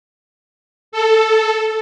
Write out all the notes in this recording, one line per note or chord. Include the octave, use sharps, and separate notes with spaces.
A4